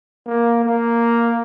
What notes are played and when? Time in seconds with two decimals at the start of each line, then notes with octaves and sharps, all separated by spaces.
0.27 A#3
0.64 A#3